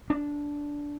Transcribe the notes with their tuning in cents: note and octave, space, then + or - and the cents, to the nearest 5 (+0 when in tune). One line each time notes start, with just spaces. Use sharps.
D4 -10